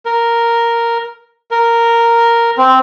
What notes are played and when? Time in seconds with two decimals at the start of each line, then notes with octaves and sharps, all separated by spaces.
0.05 A#4
1.51 A#4
2.57 C4